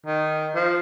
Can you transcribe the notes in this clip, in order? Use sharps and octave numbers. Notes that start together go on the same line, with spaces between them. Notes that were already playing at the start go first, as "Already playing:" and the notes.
D#3
F3